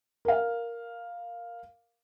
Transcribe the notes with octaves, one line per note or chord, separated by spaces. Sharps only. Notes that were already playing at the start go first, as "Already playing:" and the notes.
A#4 F5